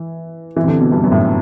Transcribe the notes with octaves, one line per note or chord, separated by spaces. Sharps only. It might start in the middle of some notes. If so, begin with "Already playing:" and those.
Already playing: E3
E3
C3
D3
B2
G2
F#2
A2